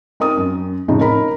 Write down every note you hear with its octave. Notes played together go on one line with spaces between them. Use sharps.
C4 D#4 A#4 D#6
F#2
F2 A2 C#3 D#4
D#4 A#4 A#5 B5